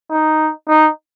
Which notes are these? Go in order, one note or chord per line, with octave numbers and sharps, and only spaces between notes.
D#4
D#4